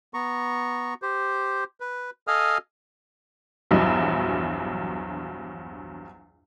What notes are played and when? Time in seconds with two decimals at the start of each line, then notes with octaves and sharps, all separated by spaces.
0.14 B3 A#5 C#6
1.02 G4 C5
1.80 B4
2.27 A4 D#5 F5 G#5 D#6 F6
3.71 A#1 E2 G2 F#3